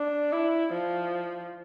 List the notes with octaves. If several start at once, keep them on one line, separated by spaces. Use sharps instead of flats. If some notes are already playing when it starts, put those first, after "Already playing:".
Already playing: D4
E4
F3